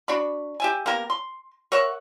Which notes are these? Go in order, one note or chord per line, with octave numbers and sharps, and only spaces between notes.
D4 F#4 D5 B5
G4 E5 G#5
A#3 B3 G4 A#4
C6
A#4 C#5 E5 F#5